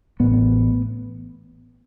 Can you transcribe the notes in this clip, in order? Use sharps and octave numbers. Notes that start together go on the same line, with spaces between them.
A1 A2 B3